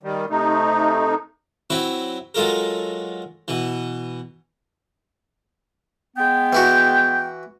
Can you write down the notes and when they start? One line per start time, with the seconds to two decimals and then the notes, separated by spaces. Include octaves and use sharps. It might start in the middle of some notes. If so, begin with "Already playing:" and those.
0.03 D#3 G3
0.30 C3 A3 D#4
1.70 F#3 C4 E4 B4
2.35 F#3 G#3 F4 A4 A#4
3.48 B2 E3
6.17 G#3 B3 G5
6.53 E3 E4 F#4